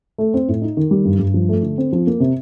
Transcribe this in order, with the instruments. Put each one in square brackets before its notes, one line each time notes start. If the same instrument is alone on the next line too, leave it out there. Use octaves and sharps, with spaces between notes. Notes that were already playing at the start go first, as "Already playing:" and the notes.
[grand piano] A3
C4
A2
D#4
D#3
G3
G2
G2
F3
A3
D3
C4
F3
A#3
C3